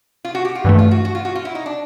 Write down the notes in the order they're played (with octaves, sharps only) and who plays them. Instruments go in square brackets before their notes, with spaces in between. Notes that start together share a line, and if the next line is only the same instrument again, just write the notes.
[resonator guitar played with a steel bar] F4
F#4
G4
F4
[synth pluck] G2 E3 A3
[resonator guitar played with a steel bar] F4
F#4
F#4
F4
F#4
F4
E4
D#4
D4